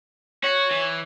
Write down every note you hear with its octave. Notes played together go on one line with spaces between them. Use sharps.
F#4 C#5
E3